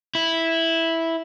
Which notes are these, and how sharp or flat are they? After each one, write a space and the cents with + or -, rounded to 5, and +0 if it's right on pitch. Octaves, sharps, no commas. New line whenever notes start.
E4 -5